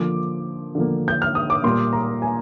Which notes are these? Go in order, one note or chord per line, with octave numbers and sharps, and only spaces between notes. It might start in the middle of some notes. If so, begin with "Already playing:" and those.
Already playing: D3 F3 A#3 D6
D3 F3 A#3
G6
F6
D#6
D6
A#2 G3 A#3 C6
A#5
G#5